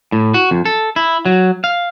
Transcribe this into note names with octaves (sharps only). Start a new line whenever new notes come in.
A2
F#4
F2
A4
E4
F#3
F5